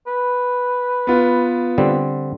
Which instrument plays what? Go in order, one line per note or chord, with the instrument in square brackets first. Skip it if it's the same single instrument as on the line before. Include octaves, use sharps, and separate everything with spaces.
[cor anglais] B4
[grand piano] B3 F4
[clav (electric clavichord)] D3 G3 C4